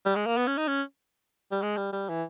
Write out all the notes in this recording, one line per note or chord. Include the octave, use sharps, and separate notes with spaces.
G3
G#3
A#3
B3
C#4
D#4
C#4
G3
G#3
G3
G3
E3